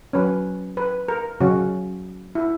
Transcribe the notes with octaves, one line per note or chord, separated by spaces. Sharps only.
F#3 C#4 B4
B4
A#4
C#3 F#3 C#4 F#4
E4